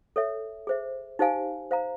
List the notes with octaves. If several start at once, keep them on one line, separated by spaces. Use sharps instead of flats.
A4 C#5 E5
G#4 C5 E5
D#4 G4 C5 F5 G#5
C5 F5 A#5